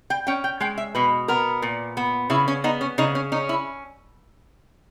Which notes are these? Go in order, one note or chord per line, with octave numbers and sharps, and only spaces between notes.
G5
C#4 G5
G5
G#3 G5
E5
B2 B4
B3 A#4
A#2
B3
C#3 E4
C#4
B3 D#4
C#4
C#3 D#4
C#4
C#4 D#4
E4